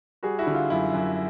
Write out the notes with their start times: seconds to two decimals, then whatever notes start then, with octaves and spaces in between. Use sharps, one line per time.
0.23 G3 F#4 G#4
0.39 E4 F#4
0.47 D3
0.54 F4
0.70 F#2 E4
0.94 F#2